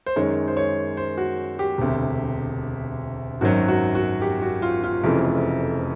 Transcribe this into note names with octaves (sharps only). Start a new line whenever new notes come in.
C5
F#2 D#3 G#3 C#5
C5
C#5
C5
F#4
G4
E1 D2 C3
G#1 F#2 D#3 F#3 F#4
F#4
F#4
G4
F#4
F4
F4
F1 F2 C#3 E3 A3